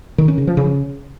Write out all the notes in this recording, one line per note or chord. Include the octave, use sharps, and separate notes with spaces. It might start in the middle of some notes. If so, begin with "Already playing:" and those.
D#3
C#4
C#3
F3
C#3